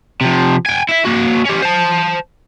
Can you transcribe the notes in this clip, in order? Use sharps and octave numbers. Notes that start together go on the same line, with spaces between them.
C3 F3
G5 G#5
E4 E5
A#3 F#4
C#4 G4
C5 A5